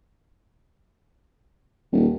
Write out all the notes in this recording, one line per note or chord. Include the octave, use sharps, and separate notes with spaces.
D#1